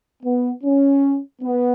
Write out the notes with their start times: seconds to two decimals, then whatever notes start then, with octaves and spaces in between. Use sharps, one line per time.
0.23 B3
0.63 C#4
1.42 B3